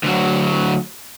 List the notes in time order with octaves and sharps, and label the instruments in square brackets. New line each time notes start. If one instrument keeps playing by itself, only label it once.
[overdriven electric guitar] D2 F#3